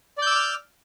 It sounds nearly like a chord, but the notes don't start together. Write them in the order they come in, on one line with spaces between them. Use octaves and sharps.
D5 G6 E6 D6 F6